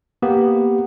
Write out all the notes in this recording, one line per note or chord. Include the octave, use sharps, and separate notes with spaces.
A#3 B3 G4